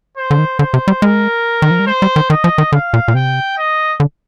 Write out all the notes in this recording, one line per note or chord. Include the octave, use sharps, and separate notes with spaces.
C5
D3
D#3
D3 C5
C3
G3
G#3 A#4
D#3
F3
G3
G#3 C5
G3
D#3
D#3 D#5
F3
D#3
D3 F5
A#2
A#2
C3 G5
D#5
D3